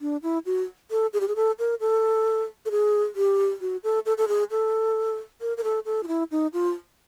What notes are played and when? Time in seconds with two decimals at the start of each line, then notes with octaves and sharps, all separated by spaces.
0.01 D4
0.23 E4
0.46 F#4
0.91 A4
1.13 G#4
1.20 G4
1.28 G#4
1.36 A4
1.59 A#4
1.80 A4
2.65 A4
2.71 G#4
3.16 G4
3.61 F#4
3.84 A4
4.06 A4
4.17 A4
4.28 G#4
4.51 A4
5.41 A#4
5.57 A#4
5.64 A4
5.85 A4
6.03 F4
6.08 E4
6.31 D#4
6.53 F4